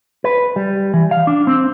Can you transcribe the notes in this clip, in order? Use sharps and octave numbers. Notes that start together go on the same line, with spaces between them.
B4
G3
E3
F5
D4
C4